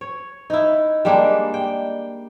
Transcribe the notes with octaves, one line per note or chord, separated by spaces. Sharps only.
C#5
D#4 E4
G3 G#3 A#3 D4
G5